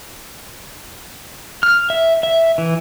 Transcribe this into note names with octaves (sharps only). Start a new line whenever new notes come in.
F6
E5
E5
E3